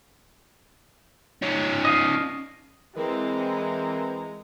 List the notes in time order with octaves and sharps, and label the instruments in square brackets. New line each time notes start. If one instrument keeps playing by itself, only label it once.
[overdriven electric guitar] C#4 D#4
[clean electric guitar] D#5 F5
[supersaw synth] E3 C4 [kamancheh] G#3 A#5 [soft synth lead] A#4